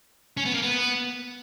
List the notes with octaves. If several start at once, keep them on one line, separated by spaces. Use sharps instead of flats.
C#4
B3
A#3
B3